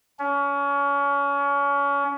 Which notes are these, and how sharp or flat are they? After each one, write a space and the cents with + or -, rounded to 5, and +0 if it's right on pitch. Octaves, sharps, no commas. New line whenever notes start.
C#4 +30